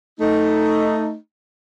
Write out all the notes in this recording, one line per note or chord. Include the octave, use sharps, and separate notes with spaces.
A3 D#4